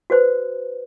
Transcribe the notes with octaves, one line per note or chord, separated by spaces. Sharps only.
F#4 B4 C5